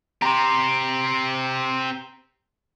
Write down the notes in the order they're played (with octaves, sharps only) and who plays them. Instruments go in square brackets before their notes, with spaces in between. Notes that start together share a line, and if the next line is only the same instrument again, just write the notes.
[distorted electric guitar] C4 G4 [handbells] A#5 C6